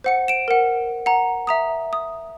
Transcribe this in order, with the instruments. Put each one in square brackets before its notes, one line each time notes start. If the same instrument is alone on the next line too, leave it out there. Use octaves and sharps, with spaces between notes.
[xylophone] C5 F#5 C#7
D7 E7
A#4 F#5
F#5 A#5
E5 A#5 D#6
D#6